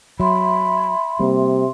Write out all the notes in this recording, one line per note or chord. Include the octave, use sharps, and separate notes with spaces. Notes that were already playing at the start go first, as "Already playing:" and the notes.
F#3 E5 B5 C6
C3 G3 A#3